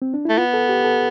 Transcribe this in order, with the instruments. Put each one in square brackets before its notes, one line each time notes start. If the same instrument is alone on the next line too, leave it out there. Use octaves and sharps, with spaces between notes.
[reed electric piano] C4
D4
[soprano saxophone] A3 [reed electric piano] E4
[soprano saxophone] B3 [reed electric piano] F4
[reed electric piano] A4
G4
A4